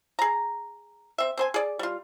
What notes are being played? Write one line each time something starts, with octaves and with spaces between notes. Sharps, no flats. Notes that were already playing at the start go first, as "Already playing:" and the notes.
G#4 A#5
C4 E5
C4 C5 G#5
G#4 D5
G3 F4